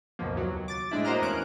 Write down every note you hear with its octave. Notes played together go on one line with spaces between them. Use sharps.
C#2 F#2 B2 F3 A#3
D#2 F#3
D6 A6
A2 G#3 D4 E4
A#3 F#4 C5 D#5 A#5 F6
E2 A#3 C#4 F#6 D7